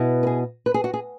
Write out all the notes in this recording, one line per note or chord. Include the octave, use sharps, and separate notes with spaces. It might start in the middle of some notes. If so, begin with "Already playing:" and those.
Already playing: B2 B3 E4
B4
G#4
B4
G#4
F#4
G#4